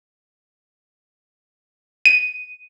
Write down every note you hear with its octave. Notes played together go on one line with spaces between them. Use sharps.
D#7